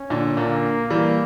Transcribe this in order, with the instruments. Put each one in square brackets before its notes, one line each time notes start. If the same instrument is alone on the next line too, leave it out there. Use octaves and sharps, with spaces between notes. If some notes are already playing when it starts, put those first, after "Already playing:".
Already playing: [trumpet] C#4
[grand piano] A#2 D3
[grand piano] A#2 D3 [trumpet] A#3
[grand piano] E3 G3 [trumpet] A#3